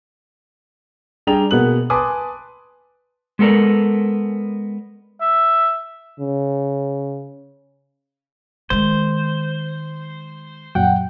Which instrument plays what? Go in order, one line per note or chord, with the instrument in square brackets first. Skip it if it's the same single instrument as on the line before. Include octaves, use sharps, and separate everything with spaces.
[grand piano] G3 D4 G#4 G5 A#5 F7
B2 A#3 B3 G#4 F#6 F#7
B4 G#5 A5 C6 D6 D#6
[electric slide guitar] G#3 B3 A4 A#4 D5
[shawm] E5
[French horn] C#3
[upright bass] D#3 G#3 [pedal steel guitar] C5
[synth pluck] F#2 A#2 F#3 [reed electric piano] F#5 G5